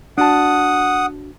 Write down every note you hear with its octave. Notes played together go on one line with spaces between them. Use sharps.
D4 F#4 F#5 A5 D#6